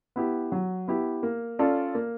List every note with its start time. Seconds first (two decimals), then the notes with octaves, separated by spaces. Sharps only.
0.16 B3 E4 G4
0.52 F#3
0.88 B3 E4 G4
1.23 A#3
1.59 C#4 F4 A4 D5
1.95 A#3